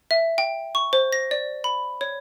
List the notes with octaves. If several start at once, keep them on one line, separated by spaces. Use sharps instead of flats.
E5
G5
C#6
C5
A#6
D5
B5
C#5